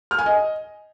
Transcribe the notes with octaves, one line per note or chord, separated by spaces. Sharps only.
F6
G#5
D#5